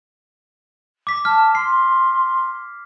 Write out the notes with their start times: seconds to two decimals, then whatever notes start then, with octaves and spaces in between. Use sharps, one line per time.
1.07 D6 B6
1.25 A5 F6
1.55 C6 C7